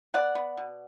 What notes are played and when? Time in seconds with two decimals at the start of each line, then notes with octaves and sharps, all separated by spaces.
0.14 B3 D5 F#5
0.35 B3
0.57 B2